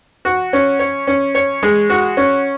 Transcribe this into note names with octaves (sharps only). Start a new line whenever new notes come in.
F#4
C#4
C#5
C#4
C#5
G#3
F#4
C#4